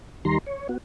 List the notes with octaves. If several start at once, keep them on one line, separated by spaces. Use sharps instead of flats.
D#2 D#3 G3 A#5 C6
C#5
B3 F#4